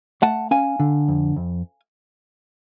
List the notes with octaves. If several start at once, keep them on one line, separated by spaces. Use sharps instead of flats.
A3 F#5 A5
C#4 F5 G#5
D3
F2
F2